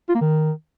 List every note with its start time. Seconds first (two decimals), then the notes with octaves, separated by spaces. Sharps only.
0.09 F4
0.15 A#3
0.21 D#3